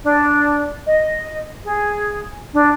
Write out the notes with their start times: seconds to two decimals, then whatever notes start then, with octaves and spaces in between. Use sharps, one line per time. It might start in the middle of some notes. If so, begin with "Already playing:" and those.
0.03 D4
0.85 D#5
1.65 G#4
2.53 D4